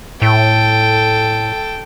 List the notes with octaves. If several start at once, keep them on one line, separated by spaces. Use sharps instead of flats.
A2 A4 G5